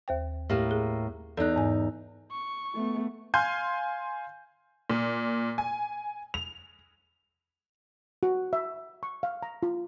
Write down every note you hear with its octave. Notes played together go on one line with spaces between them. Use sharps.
D#2 C5 G5
A2 A#3 G4
G#4
E2 D#4 A4 F#6
G#2 G#5
C#6
A3 B3
F5 G#5 C6 G6
A#2
G#5
F7
F#4
E5
C#6
F5
A#5
F4